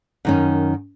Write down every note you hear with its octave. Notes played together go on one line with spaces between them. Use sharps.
F#2 D#3 C#4